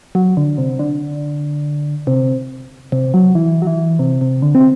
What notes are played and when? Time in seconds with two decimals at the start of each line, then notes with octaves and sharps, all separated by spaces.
0.15 F#3
0.37 D3
0.58 C3
0.79 D3
2.07 C3
2.92 C3
3.14 F#3
3.35 E3
3.62 F#3
3.67 E3
3.99 C3
4.21 C3
4.42 D3
4.55 C4